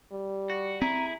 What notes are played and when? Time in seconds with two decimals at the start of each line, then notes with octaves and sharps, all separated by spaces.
0.12 G3
0.50 F#4
0.82 C4 E4 G#4 A#5